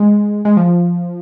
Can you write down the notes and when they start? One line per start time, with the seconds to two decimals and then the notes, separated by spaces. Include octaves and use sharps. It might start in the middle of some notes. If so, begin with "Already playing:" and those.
Already playing: G#3
0.45 G#3
0.57 F3